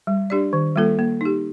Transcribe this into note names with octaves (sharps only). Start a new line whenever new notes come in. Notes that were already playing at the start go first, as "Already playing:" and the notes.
G3
D4 G4 D5
D#3
G3 A#3 F4 A4
A#3
D#4 G4